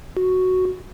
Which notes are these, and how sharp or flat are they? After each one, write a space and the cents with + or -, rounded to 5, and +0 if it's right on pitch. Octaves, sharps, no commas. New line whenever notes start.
F#4 +0